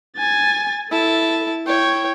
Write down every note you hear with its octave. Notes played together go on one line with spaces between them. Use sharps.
G#5 A6
E4 A4 A5
E4 C#5 G5 G#6